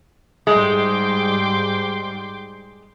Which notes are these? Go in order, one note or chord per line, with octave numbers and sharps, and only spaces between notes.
G#2 G3 G#3 G5 C6 D6